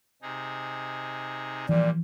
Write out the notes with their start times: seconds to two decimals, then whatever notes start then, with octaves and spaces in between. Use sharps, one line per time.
0.22 C3 D#4 G#4
1.69 A#2 E3 F3 G3 D5